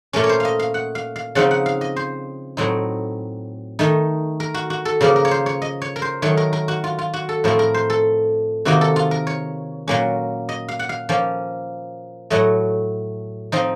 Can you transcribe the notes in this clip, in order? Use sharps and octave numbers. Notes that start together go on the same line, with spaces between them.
A#2 A3 C#4 A#4
C#5
C5
D#5 F5
F5
F#5
F5
F5
C#3 F3 C4 D#4 F#5
F#5
F5
D#5
C5
A2 F#3 C4 D#4
D#3 A3 D#4
A#4
F#4
F#4
A4
C#3 F3 A#3 A#4
A#4
C#5
C5
C#5
D#5
C#5
A#4
C5
D#3 F#3 A3 C#5
A#4
A#4
F#4
F4
F4
F#4
A4
A2 F3 A3 C4 A#4
A#4
C5
A4
C3 D#3 A#3 D#4 F#4
A4
F4
A#4
C#5
A#2 F#3 A#3 C#4
D#5
F5
F#5
F5
F3 A#3 C#4
A2 F#3 A3 D#5
F3 C4 D#4 D#5